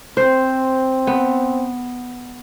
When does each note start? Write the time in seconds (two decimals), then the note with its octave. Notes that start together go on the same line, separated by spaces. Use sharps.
0.17 C4 C5
1.07 B3